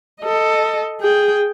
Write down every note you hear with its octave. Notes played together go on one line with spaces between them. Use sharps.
A4 D#5
G#4 G5